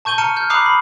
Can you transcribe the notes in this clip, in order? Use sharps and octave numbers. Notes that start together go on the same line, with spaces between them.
A5 C#6 G6 D#7 G7
A5 A#5 F6 C#7 D#7
F6 G6
A#5 B5 D6 D#6 F#6 C7
B5